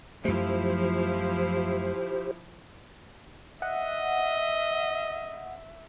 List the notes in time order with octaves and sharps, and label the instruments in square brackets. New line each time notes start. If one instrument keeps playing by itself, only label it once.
[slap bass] F#2 A3 [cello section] F3 E4 [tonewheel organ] G4 C5
[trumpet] D#5 [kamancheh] E5 [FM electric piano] F#5